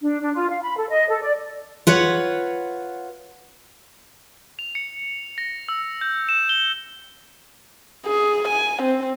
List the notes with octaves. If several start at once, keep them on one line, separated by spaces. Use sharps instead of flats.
D4
D4
F4
F5
B5
A4
D#5
A4
D5
F4 B4 C#5 F#5
F7
C#7
A#6
E6
G6
E7
G7
G#4
G#5
C4